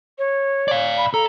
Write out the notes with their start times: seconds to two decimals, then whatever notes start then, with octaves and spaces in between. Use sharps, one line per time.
0.18 C#5
0.68 D5 F5
0.98 B5
1.14 A4 A#5